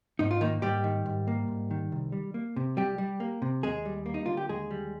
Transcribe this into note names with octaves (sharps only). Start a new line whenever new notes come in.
G#2 D#4
F4
D#3 A#3 D#4
G#2 G3 G4
D#3
G#2
A#3
G#2
D#3
C2
G3
A#3
C3
C2 G3 G4
G3
A#3
C3
D#2 G#3 G#4
G3
A#3
D#4
D3 F4
G4
D#2 G#3 G#4
G3